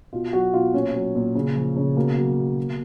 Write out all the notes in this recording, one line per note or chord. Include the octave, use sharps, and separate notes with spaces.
B2 F4
F#3 F#4
B2 F4
A#2 C#4
F#3
A#2
C#3
F3
C#3
B2 A#3
F#3
B2
B2